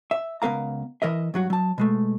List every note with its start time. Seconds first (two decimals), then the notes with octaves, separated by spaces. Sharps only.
0.11 E5
0.42 C#2 B3 A#4 F5 A#5
1.02 E3 A#4 D#5 E5
1.34 G2 F#3 F#4
1.50 F#3 A5
1.78 B2 G#3 A3